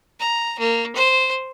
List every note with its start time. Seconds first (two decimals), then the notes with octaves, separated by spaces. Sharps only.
0.20 A#5
0.59 A#3
0.96 C5